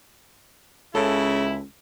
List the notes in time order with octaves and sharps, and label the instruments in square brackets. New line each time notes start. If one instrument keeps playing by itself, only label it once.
[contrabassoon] C#2 [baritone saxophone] C#3 [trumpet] E4 [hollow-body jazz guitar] A4